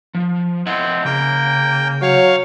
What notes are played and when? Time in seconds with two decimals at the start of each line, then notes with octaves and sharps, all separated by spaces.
0.14 F3
0.67 C4 E4 D#5 F#5
1.05 C#3 A#3 G5
2.02 F#3 C#5 F5